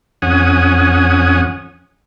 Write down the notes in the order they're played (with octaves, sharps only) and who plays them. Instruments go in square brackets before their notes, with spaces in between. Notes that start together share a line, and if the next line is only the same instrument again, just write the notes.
[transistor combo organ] F2 C#4 F#5 G#5 D#6